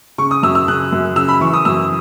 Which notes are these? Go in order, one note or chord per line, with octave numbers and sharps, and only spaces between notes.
C#3 C#6
D#6
F#2 E6
E6
C#3 F#6
F#2
C#3 E6
B5
E3 C#6
D#6
F#2 E6